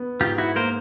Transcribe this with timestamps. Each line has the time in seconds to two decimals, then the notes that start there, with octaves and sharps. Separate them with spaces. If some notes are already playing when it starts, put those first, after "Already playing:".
Already playing: B3
0.20 G#2 F4 G4
0.38 E4 F#4
0.56 A#3 A#4 C5